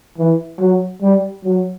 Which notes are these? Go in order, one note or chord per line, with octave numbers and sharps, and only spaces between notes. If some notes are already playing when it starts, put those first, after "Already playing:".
E3
F#3
G3
F#3